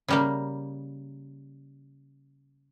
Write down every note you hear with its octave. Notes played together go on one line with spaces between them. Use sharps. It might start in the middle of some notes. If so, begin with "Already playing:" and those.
C#3 G3 A#3